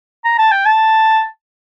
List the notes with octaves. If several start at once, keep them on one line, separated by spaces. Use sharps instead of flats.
A#5
A5
G5
A5